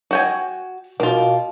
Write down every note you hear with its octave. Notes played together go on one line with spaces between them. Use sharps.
F#4 G5 G#5
B2 A#3 F4